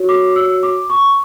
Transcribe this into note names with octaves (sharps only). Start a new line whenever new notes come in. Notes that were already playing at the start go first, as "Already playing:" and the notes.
Already playing: F#4 C#5
D6
E6
D6
C#6